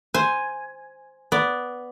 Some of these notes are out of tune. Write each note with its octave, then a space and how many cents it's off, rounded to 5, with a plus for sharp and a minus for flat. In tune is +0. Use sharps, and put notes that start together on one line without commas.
C5 +0 G#5 +0
B3 +0 D5 -10